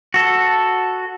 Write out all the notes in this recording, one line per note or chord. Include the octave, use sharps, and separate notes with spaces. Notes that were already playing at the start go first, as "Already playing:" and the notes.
F#4 A4